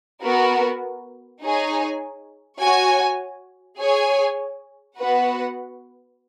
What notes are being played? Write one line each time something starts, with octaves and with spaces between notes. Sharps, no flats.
B3 F#4 A#4
D#4 G#4 C#5 G#5
F#4 C#5 G#5
G#4 C#5 G#5
B3 F#4 B4 F#5